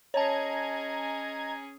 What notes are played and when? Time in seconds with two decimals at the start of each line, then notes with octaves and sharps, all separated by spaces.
0.14 C#4 G#4 C#5 D#5 A5 A#5 G#6